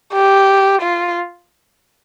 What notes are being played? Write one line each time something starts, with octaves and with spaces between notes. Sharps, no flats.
G4
F4